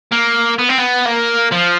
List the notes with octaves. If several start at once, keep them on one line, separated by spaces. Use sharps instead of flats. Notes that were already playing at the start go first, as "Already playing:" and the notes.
A#3
B3
C4
B3
A#3
F3